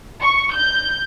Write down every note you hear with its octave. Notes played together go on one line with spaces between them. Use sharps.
C#6
G6